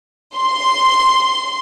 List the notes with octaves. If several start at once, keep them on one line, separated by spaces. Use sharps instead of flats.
C6